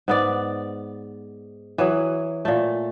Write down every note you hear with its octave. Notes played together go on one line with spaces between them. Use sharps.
G#2 B3 D5
E3 F#3 G#4
A#2 A3